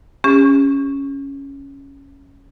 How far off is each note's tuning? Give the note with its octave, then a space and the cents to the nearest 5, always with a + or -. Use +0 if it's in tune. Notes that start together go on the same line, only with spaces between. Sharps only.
C#4 +0 G4 +45